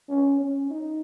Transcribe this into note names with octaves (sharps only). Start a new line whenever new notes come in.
C#4
C#4
D#4